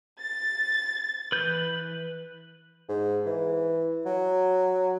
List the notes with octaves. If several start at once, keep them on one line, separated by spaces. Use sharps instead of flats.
A6
E3 B4 G6
G#2
E3
F#3